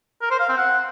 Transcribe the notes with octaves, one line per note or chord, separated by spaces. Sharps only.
A#4
C5
F5
C4
F#5